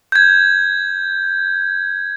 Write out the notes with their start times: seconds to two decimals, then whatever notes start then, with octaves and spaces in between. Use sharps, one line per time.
0.12 G6 G#6